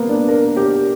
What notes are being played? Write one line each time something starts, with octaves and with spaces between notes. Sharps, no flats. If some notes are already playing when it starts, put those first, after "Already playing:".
Already playing: A#3 B3
D4
A#4
G4